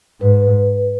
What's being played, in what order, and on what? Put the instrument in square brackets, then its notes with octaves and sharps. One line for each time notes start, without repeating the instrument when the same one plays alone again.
[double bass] G#2 [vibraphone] B4